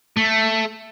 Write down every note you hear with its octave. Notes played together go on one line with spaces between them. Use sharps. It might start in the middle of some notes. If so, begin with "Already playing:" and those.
A3